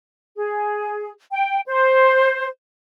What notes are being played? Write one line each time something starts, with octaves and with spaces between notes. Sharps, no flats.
G#4
G5
C5